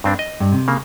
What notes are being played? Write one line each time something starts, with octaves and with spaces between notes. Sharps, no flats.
G2 C4 D4
D#5
G2
C3
C#3 A#3